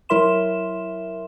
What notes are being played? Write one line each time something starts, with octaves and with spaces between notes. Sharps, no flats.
F#3 E4 A#4 E5 C6 E7